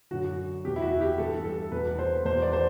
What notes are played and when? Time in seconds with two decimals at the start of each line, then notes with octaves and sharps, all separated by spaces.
0.11 F#2 D3 F#4
0.65 E2 B2 G4
0.76 E4
0.82 F#4
1.01 G4
1.18 G2 E3 A4
1.45 A4
1.72 E2 B2 B4
1.99 C5
2.25 E2 B2 C5
2.42 D5
2.53 C5